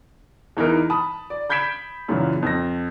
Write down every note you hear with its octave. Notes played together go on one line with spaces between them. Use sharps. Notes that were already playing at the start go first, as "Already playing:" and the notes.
E2 E3 D#4 A#4
A5 B5 D#6
D5
B5 G6 G#6 B6 D7 E7
F#2 A#2 C#3 E3 F#3
F2 A#6